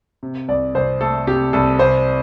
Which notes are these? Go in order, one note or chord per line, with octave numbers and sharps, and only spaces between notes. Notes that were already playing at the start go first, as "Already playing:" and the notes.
C3
C2 D5
C2 C5
A3 A4
C3 G4
C2 A4
C3 C5